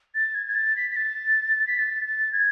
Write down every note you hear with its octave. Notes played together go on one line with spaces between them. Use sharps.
A6
G#6
G#6
A6
B6
B6
A6
B6
A6
A6
G#6